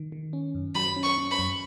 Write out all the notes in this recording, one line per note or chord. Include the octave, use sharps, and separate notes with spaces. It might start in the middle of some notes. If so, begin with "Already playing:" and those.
Already playing: D#3
D#3
C#4
F#2
F#3 B5
C#4
C#6
C#4
B5
F#2